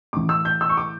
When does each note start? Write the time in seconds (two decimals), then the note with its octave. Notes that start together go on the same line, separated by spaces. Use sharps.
0.13 A2 E3 D6
0.29 E6
0.45 G6
0.61 E6
0.69 C#6
0.77 D6